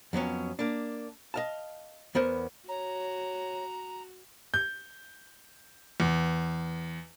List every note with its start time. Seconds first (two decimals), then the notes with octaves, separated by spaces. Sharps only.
0.13 F2 F#3 B3 C#4
0.59 A#3 D4
1.34 D#5 F5 A5
2.15 E2 B3 A#4 C5
2.68 F#4 C#5 A#5
4.54 G6
6.00 E2